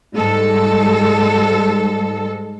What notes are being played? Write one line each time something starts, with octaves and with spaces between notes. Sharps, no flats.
G#2 G3 G#3 A4